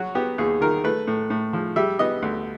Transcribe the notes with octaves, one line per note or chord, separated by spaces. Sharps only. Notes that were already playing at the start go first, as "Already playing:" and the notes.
Already playing: F#3 F#4
B3 G4
D#2 G#4
D#3 A#4
A3 B4
A2
A2
F3
G3 E5
B3 D#5
D2